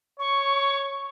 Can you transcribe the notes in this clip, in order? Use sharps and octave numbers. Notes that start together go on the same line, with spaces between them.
C#5 C#6